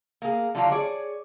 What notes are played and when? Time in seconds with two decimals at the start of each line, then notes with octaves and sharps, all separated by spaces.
0.22 A#3 G#4
0.55 D3 F#3 G3 D4 D#4 F4
0.71 G#4 C#5 D5